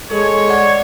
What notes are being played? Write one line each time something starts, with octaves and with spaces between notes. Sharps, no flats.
G#3 A4 C#5
D5 F#5